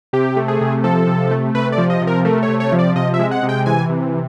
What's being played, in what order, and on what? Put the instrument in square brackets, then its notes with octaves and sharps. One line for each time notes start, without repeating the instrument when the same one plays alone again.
[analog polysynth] C3 G4
A3
G#4
C3
F3 A4
C3
A3
C3 B4
D5
F3
D#5
C3
A#4
A3 A#4
C#5
C3
C#5
F3
D5
C3 D#5
E5
G#3
F#5
C3
G5
E3 G#5
C3